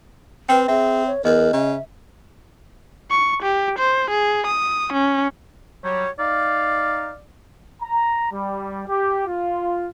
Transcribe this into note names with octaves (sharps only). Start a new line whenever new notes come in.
C4 B4 G5
C4 G#4 E5
C#5
E2 A#4 D#5
C#3 E5
C#6
G4
C5
G#4
D#6
C#4
F#3 G3 C#5
D#4 D5 F5
A#5
G3
G4
F4